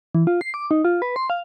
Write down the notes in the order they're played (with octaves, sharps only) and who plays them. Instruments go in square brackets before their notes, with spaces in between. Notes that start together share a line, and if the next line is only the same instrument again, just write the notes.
[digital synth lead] E3
F4
C7
D6
D#4
F4
B4
C6
F5